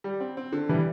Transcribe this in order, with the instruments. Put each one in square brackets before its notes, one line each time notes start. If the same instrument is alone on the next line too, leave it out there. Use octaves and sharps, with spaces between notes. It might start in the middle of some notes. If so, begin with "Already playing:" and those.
[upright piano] G3
C4
C4
D3
[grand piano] E3 [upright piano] G3